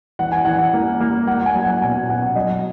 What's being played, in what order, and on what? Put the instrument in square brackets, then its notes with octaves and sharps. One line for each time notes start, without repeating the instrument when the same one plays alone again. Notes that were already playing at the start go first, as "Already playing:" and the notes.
[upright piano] E3 F#5
G#5
E3 F#5
A#3
A#3
A#3 F#5
G#5
F#3
F#5
B2 G#5
B2 F#5
F#3 D#5